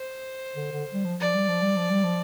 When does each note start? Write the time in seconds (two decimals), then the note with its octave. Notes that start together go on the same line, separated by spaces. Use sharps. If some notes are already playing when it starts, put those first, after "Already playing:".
Already playing: C5
0.56 D3
0.72 D3
0.93 G3
1.05 F3
1.20 F3 D5
1.35 G3
1.48 F3
1.62 G3
1.76 F3
1.90 G3
2.04 F3